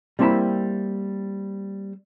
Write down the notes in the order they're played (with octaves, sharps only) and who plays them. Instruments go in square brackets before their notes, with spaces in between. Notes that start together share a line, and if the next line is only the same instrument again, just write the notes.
[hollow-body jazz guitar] G3 A#3 C4 E4 A5 B5